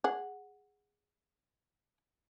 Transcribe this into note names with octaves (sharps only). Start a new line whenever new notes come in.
G#4 F#5